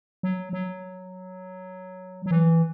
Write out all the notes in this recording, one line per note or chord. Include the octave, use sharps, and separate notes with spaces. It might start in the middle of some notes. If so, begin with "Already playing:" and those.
F#3
F#3
F#3
E3